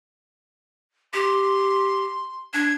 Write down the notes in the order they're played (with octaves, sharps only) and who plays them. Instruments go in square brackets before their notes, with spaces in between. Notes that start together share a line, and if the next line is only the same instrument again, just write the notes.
[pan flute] G4 [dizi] C6
[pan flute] D4 [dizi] G#6